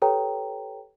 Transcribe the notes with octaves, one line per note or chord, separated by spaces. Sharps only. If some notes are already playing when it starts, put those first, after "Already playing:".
G4 A4 B4 C#5 G5 A#5